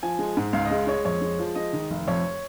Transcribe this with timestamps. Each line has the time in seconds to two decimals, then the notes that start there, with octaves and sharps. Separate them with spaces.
0.03 F3 G#5
0.19 G#3
0.37 G#2
0.53 C#2 F5
0.65 D#5
0.71 G#3 F5
0.87 G#3 C#5
1.05 F2 C#5
1.21 G#3
1.39 F3
1.55 G#3 D#5
1.73 D#3
1.90 F1
2.08 F2 C#5